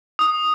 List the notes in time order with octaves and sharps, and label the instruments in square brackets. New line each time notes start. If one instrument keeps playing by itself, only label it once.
[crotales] D#6